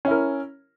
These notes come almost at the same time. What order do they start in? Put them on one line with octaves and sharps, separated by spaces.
C#4 E4 A#4